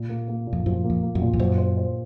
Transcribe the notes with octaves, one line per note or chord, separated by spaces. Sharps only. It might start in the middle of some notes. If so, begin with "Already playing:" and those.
Already playing: A#2
A#3
A#3
A#2
F2
F#2 F3
A#3
F2
A#3
F#2
A#2
F2
F#2 C5
C5
C5